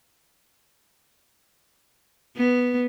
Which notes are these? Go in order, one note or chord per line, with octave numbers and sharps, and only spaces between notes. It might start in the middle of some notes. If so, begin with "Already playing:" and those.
B3